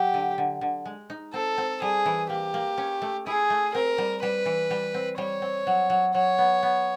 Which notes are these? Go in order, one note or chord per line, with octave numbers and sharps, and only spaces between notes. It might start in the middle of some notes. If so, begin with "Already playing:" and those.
Already playing: F#3 G4
D3
D3
D3
G#3
D#4
C4 A4
C4
G3 G#4
E3
A#3 G4
A#3
C#4
A3
E4 G#4
A3
C4 A#4
G3
G3 B4
E3
G3
C4
G3 C#5
C4
F#3
F#3
F#3 C#5
B3
B3